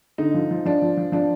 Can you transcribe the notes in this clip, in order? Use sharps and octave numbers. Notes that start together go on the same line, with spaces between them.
D3 D#4
F3
F3
F3 D4
F3
F3
F3 D4